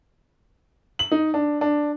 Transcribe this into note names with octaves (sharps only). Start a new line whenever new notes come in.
F#7
D#4
D4
D4